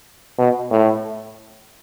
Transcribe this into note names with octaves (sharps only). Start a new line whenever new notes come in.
B2
A2